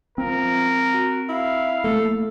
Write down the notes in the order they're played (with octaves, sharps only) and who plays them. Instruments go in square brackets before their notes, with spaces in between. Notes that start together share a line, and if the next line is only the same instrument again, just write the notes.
[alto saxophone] F3 [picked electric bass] C4 [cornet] A#4
[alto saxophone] F#4
[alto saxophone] E4 [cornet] F5
[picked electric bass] A3 A#3 [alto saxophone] A4